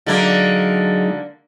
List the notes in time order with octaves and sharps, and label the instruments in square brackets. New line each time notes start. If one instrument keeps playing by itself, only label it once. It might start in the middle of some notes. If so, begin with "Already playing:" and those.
[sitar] D3 A#3 [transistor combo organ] F#3 G#3 D#4